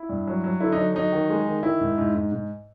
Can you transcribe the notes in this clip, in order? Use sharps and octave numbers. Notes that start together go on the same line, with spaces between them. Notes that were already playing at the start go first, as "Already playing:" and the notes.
Already playing: E4
G2
F#3
F#3
D3 E4
D#4
F#3
F#3 D#4
D#3
G#3
D#3
D#3 E4
G#2
G#2
G#2
G#2